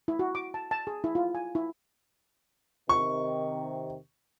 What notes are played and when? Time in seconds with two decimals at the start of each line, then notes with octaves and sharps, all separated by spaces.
0.08 E4
0.19 F#4
0.35 D6
0.54 A5
0.71 A5
0.87 G#4
1.04 E4
1.15 F4
1.35 G#5
1.55 E4
2.89 C3 D#3 C#6